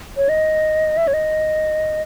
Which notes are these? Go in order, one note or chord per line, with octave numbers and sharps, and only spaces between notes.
C#5
D#5
E5
C#5
D#5